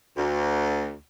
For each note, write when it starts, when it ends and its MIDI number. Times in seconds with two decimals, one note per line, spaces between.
0.17 0.94 38